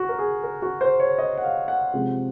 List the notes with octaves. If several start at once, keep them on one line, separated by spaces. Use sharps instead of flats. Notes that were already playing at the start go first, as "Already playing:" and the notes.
Already playing: F#4
A#4
G#4
A#4
F#4
C5
C#5
D#5
F#5
F5
F#5
C3 F3 G#3